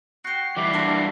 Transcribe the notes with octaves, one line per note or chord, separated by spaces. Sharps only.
F#4 G4 C7
E3 G3 E4 D6
A#3 D4 F#4 C6